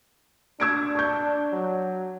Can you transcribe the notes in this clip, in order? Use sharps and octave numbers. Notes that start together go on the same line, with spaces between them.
D4 E6 G#6 D7
C#6 G6
F#3